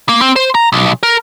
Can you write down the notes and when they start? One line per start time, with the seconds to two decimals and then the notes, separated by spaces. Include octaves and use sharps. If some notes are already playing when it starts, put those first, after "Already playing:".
0.09 A#3
0.21 C4
0.36 C5
0.55 A#5
0.72 B1
1.03 A#4